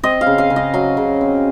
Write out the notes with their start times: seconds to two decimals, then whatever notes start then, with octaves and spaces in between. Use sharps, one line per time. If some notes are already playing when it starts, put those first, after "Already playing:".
0.03 C4 D#5
0.21 F5
0.26 C#3
0.38 F5
0.50 C#3
0.56 D#5
0.74 F#3 F5
0.97 C#3
1.21 C4